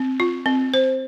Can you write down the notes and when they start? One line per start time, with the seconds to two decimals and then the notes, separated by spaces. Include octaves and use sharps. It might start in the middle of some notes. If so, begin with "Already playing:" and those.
Already playing: C4
0.20 F4
0.46 C4
0.74 C5